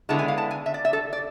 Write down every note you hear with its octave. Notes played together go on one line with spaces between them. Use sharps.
D3 G#3 B3 E4 A5
G#5
F5
A5
G#5
E5
D5
E5
A4
D5